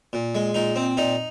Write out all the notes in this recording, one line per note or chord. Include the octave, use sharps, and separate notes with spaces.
A#2
G#3
A#2 D#4
C4
A#2 D#4